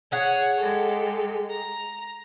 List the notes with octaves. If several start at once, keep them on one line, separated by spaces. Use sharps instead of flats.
G#4 C#5 F#5
G#3 G4 A4
A#5